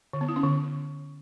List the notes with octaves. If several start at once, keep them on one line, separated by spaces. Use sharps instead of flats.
D3
B3
E4
C#4
D3